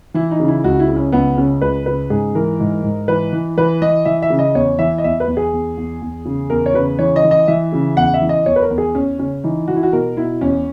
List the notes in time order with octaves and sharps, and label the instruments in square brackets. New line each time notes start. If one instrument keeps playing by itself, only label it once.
[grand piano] E3 E4
D#4
C#3
E4
C#2 F#4
E4
C#3
C#4
C#2 B3
C#3 C#4
C#2 B4
C#3 B4
G#2 G#4
E3 A#4
G#2
G#2
E3 B4
E3
E3 B4
E3 D#5
E3 E5
E5
C#3
D#5
E2 C#5
E3 E5
D#5
E2 E5
B4
E2
G#4
E2
E2
E2
C#3
E2 A#4
C#5
C#3 B4
E3 C#5
D#5
E3
D#5
E3 E5
C#3
E2 F#5
E5
E3
D#5
E2 C#5
B4
A#4
E2
G#4
E2 C#4
C#3 C#4
E3 D#4
E3 F#4
E4
F#4
B2 A#4
B2 E4
E2 C#4